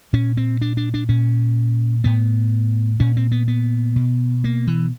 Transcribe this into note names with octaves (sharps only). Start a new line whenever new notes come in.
A#2 C#4
C4
D4
D4
D4
A#2 C#4
A2 B3
A#2 C#4
C4
B3
B3
B2
A#3
E3